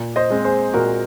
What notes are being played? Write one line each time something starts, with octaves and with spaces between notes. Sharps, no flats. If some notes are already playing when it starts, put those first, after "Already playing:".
Already playing: A#2
C5 D#5
G#3 C4
G#4 C5
A#2 F#4 A#4